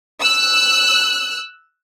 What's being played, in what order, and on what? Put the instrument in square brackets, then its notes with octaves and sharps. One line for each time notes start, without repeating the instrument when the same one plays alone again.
[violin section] E6 F#6